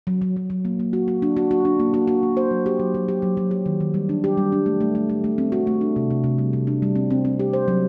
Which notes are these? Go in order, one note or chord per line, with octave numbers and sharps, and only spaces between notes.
F#3
F#3
F#3
F#3
A#3
A#3
F#4
F#4
D4
F#4
F#4
D4
A#3
F#4
F#4
A#3
C5
F#3
G4
F#3
F#3
G4
F#3
F#3
G4
D#3
D#3
G3
D4
G4
G3
D4
A3
A3
A3
A3
A3
C4
F#4
A3
D4
C3
C3
C3
G3
C3
D4
G3
C4
C4
C4
G4
C5
F#3